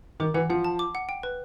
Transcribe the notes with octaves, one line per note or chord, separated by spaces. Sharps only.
D#3 D6
E3 F#5
F3 F#5
A5
D6
F#5
G5
B4